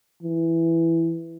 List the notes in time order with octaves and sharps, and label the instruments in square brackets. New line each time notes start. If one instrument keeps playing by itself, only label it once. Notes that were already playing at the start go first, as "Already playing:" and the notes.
[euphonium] E3